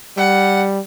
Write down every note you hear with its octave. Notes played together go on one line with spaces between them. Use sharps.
G3 F#5